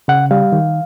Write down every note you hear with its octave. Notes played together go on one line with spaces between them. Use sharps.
C#3 F#5
G3 F5
D#3